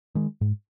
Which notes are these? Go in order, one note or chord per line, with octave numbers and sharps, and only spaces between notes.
D#3 G#3
G#2